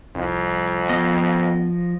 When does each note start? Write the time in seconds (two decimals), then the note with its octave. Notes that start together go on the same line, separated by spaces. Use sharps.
0.15 C2 F2
0.89 F3 B3 D#5